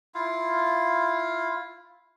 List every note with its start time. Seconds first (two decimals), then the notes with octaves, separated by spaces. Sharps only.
0.15 E4 F4 F5